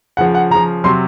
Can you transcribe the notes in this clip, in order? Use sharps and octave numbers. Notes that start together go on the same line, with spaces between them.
C#3 F3 F#5
F#5
C#3 F3 A#5
C3 F#3 C6